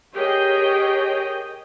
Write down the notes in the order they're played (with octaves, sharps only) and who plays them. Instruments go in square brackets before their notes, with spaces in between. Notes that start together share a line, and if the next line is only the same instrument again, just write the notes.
[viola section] G4 G#4 A#4 C#5 D#5 G5